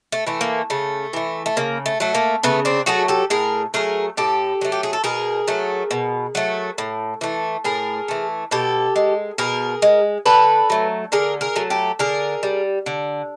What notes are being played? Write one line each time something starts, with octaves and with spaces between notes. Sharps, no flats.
A3
E3 A3
A#3
C#3 A3
E3 A3
A3
C#3 A#3
A3
F#3 A3
A#3
C#3 A3 B3
C4 D4
F#3 A3 F#4 G#4
G4 A4
A2 G#4 A#4
F#3 A3 G#4 A#4
A2 G4 A4
F#3 A3
G4
G#4
A4
B2 G#4 A#4
F#3 A3
B2
F#3 A3
A2
E3 A3
A2 G#4 A#4
E3 A3
B2 G4 A4
G#3
B2 G#4 A#4
G#3
D3 A4 B4
F#3 A3
D3 G#4 A#4
G#4 A#4
F#3 A3
G4 A4
D3 G#4 A#4
G3
D3